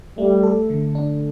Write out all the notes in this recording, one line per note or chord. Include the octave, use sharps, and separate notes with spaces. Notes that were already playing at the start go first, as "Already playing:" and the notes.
G3 A3
A4
D3
D4